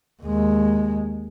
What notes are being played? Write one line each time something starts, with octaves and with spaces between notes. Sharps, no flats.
D#2 G#3